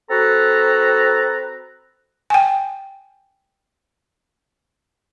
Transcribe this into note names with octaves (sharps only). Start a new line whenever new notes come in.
C4 F#4 A4 B4 A#5
G5 G#5